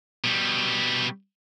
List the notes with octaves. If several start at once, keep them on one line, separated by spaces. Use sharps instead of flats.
B2 G3